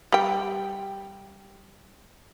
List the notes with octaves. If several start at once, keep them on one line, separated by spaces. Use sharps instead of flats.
G3 G5